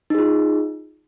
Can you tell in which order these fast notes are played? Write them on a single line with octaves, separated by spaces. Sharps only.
D#4 G#4 F4